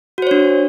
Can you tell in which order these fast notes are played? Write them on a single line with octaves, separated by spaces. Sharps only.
F#4 C5 C#5 D4